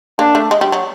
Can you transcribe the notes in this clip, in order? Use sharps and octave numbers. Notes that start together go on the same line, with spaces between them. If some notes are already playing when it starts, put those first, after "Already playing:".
A#3 D4
A3
G#3
G3
F#3